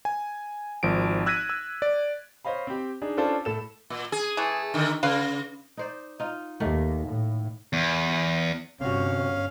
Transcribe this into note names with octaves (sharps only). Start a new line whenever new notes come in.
G#5
G#1 F3 D7
E6 F#6 G#6 A#6 B6 D#7
E6
D5
C5 C#5 D#5 F5 B5
C4 G4
D4 D#4 G#4
C#4 D4 F4 A4 C5 A5
A2 A4 E7
A#2
G#4
E3 A3
D3 D#3
C#3 B4 F5
D#4 C5 D5
D#4 F4
D#2 D#3 A3 A#3
A2
E2
G1 C3 C#4 F#4 F5